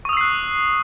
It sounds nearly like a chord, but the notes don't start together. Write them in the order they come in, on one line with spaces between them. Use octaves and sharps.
C#6 D#6 E6 C7 F#6